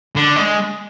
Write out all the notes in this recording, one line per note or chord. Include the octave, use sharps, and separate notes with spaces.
D3
G#3